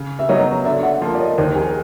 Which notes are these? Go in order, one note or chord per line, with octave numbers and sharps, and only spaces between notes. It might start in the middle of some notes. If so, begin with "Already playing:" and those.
Already playing: C#3
E5
F#3 B3 D#4 F#4 C#5 D#5
D3 D5 E5
E5 F#5
F3 A#3
D5
C#5 D#5
D#2 A#4 C5
G#4 A#4